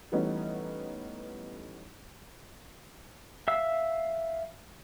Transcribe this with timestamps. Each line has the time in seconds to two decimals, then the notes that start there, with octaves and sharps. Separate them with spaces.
0.12 E3 G3 A3 B3 C#4 D#4
3.48 E5 F5 E6